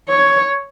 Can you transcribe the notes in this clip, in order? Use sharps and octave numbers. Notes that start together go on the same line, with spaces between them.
C#5